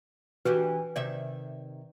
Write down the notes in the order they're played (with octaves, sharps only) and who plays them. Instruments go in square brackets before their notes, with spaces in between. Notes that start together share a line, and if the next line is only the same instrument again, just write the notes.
[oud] E3 D4 G4 [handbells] F#4 [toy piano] B4
[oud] C3 D#3 E5 [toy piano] D5